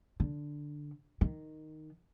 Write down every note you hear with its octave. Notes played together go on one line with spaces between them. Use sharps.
D3
D#3